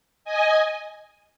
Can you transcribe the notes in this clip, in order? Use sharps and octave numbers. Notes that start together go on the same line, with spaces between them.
D#5 G#5